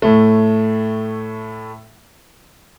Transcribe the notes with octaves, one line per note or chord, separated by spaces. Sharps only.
A2 A3